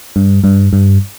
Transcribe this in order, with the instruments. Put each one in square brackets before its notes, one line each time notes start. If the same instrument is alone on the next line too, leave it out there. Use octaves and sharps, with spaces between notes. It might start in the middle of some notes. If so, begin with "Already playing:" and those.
[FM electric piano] G2
G2
G2